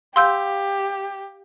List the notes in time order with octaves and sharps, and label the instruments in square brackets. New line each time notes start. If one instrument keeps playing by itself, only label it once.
[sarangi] G4 [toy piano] F5 F#5 [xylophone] C6 E6 G6